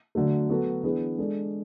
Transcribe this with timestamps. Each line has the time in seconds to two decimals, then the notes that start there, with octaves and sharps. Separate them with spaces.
0.15 D3 F#3 A3
0.49 F#3 B3 F#4 A4
0.83 E3 B3 D4 G#4 B4
1.18 G#3 D4 A4